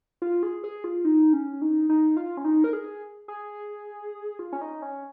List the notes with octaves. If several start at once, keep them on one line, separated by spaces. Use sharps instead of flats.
F4
G#4
G#4
F4
D#4
C#4
D#4
D#4
F4
C#4
D#4
A#4
G#4
G#4
F4
C#4
D#4
C#4